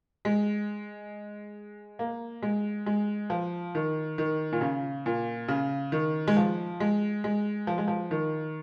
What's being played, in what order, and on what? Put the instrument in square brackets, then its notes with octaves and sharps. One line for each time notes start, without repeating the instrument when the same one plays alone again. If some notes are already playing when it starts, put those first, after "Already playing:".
[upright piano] G#3
A#3
G#3
G#3
F3
D#3
D#3
A#2
C#3
A#2
C#3
D#3
G#3
F3
G#3
G#3
F3
G#3
F3
D#3